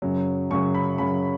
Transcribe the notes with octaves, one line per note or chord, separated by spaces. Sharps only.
F#2 C#3 F#3
F#2 C#3 F#3 C#6
B5
F#2 C#3 F#3 B5